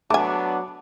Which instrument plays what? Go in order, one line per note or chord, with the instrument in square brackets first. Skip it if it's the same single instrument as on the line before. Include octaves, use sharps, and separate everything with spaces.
[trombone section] F#3 B3 D4 [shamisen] A3 G#5 [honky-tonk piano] A5 D6